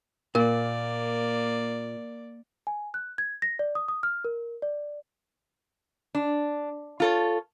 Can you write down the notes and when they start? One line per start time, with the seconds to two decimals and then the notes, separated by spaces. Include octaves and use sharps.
0.35 A#2 A#3 A#4 D5
2.67 G#5
2.94 F#6
3.18 G#6
3.42 A#6
3.59 D5
3.75 D#6
3.88 D#6
4.03 F6
4.24 A#4
4.62 D5
6.15 D4
7.00 F4 A4 C#5